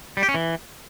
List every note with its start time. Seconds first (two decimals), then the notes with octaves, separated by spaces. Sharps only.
0.17 G3
0.23 G4
0.29 C#4
0.34 E3